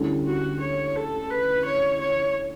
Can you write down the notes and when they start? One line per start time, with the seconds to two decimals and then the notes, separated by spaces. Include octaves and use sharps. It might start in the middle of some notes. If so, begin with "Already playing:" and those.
Already playing: D2 D3 G3 C#4 E4
0.26 F#4
0.61 C#5
0.95 A4
1.30 B4
1.65 C#5
2.00 C#5